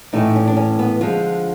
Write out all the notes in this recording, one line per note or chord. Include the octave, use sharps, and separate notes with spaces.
A2 E3 A3 D#4
C#4
D4
C#4
B3
D3 F3 G#3 F4